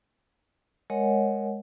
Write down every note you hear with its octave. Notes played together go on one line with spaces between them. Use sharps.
G#3 A#4 C#5 D#5 F#5 G#5